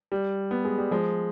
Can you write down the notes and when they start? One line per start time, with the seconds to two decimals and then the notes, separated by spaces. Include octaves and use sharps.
0.12 G3
0.51 B3
0.65 G#3
0.78 G3
0.91 F3 G#3